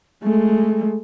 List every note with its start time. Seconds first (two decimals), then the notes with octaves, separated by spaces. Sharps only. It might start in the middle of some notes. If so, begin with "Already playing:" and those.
0.24 G#3 A3